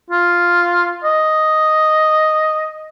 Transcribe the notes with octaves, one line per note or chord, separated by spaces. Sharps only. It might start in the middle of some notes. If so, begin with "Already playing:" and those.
F4
D#5